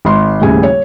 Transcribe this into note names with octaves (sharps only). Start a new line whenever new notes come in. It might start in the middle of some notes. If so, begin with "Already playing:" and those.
G#1 C6
D#1 A2 C#3 G#5
C#5